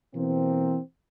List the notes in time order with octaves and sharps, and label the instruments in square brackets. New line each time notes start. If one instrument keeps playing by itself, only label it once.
[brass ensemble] B2 E3 A#3 C4